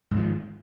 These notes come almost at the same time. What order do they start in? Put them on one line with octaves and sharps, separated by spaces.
G#2 G#3 F3 D#3